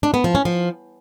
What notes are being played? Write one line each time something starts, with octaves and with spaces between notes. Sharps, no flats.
D4
B3
F3
C#4
F3